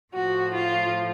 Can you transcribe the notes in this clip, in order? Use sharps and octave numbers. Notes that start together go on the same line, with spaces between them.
A2 F3 F#4
F4